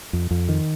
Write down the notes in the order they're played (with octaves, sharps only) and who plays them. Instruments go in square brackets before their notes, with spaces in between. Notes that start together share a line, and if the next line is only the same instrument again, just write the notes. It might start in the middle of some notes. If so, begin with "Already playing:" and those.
[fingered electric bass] F2
F2
D#3